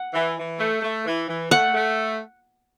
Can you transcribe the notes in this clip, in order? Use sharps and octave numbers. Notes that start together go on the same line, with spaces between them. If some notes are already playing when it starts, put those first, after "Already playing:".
Already playing: F#5
E3
E3
A3
A3
E3
E3
A3 F#5
A3